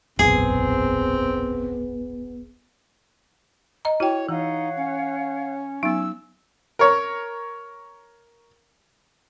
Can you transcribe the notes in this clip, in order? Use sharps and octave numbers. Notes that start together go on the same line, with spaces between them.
E1 A#1 F#2 B3 C4 G#4
D#5 A#5
E4 F#4 C#5 G5
E3 D#4 C#5 F5 F#5
C#4
F#3 B3 D#4 E6
A#4 C#5